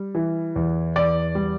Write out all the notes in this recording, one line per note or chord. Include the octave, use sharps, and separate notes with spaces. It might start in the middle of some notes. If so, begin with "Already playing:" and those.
Already playing: G3
E3
E2
E2 D5
G3